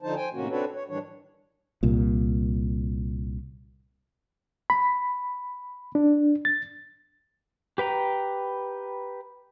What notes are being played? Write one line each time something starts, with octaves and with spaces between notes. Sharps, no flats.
D3 F3 D#4 C5 A5
C5 G5 G#5
A2 C3 D#3 A#3 C#4 F#4
C4 D4 F#4 A4 B4 C#5
C#5
G#2 D#3 E3 G3 D4 C#5
C2 A#2
B5
D4
A6
G4 B4 G5 A#5